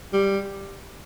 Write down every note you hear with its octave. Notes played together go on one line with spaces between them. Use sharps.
G3